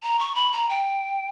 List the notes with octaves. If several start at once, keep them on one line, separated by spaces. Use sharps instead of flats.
A#5
C#6
B5
A#5
G5